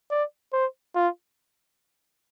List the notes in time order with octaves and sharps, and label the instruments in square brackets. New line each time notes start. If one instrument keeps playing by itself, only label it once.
[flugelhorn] D5
C5
F4